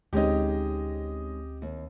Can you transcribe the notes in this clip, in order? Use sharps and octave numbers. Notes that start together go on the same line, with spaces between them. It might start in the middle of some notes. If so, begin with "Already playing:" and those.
D2 G#3 C4 C#4 D#4 G4 D#5
D#2